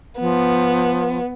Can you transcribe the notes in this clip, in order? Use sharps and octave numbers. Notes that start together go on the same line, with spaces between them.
F3 B3